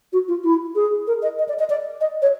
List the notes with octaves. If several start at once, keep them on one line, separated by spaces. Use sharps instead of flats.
F#4
F4
E4
G#4
A#4
D#5
D#5
D5
D#5
D5
D#5
C#5